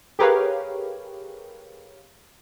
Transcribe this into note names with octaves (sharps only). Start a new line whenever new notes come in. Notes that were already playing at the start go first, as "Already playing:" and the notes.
G4 G#4 A#4 B4 C#5 F5